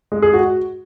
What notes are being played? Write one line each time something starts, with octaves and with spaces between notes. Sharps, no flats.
G#3
G#4
F#4